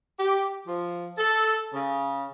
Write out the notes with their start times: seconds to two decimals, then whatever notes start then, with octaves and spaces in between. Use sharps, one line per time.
0.17 G4
0.66 F3
1.18 A4
1.72 C#3